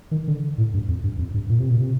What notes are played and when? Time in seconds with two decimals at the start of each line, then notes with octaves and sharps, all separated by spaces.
0.11 D#3
0.28 D3
0.58 A2
0.74 G2
0.89 F2
1.04 G2
1.18 F2
1.34 G2
1.49 A#2
1.60 C3
1.70 A#2
1.80 C3